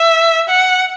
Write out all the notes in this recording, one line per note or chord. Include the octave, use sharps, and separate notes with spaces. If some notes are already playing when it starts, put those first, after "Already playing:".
Already playing: E5
F#5